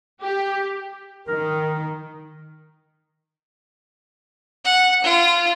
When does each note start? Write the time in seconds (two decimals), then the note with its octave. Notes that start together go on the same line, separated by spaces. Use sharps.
0.21 G4
1.28 D#3 A#4
4.65 F#5
5.04 F4